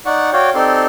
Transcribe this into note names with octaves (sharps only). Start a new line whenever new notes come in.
D#4 D5 F#5 C#6
F#4 C#5 D5 F5 G5
C4 D#4 G4 A4 D5 C6